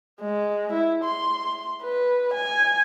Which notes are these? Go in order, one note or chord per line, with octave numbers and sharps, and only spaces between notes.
G#3
E4
C6
B4
G#5